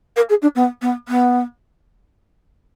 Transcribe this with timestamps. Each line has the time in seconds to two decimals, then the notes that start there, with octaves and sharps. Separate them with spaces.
0.16 A#4
0.29 G#4
0.42 D4
0.55 B3
0.82 B3
1.08 B3